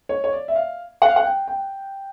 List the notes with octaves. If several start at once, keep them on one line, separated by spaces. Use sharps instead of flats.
C#5
C#5
D5
E5
F5
F#5
F5
F#5
G5
G5